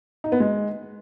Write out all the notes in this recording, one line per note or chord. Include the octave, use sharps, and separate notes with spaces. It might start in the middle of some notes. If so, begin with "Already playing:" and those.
D#4
B3
G#3